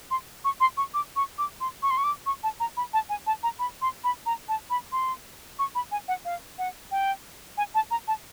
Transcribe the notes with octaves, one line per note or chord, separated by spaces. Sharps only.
C6
C#6
C6
C#6
D6
C#6
D6
C6
C#6
C6
C#6
D6
C#6
A5
A#5
B5
A5
G#5
A5
A#5
B5
C6
B5
A#5
A5
B5
C6
C#6
B5
G#5
F#5
F5
F#5
G5
G#5
A5
A#5
A5